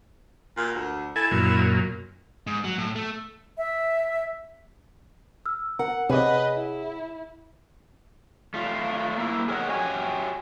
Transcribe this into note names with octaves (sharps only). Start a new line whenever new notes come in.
A#2
D2
E4 A4 G#5
F#2 A#2
G#2
F#3
A2
A3
E5
E6 F6
A#4 F#5
C3 G#4 B4 C#5 D#5 F#5
E4
A3 F4
A#3 E4
G#4 A#4 C#5 D#5 F#5
F#4 G4 C#5 G#5